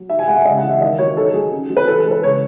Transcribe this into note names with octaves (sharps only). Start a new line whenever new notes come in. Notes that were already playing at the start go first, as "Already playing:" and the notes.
Already playing: F#3
D#4 E5
G#5
G#3 F#5
E5
C#3 D#5
F#5
E3
E5
D#3 D#5
F#3 C#5
D#4 A4
F#3 G#4
C#4
F#3
B4
E3 A4
A4
G#3
B4
C#3 C#5